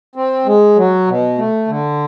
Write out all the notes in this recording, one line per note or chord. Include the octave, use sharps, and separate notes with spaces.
C4
G#3
F#3
B2
A3
D3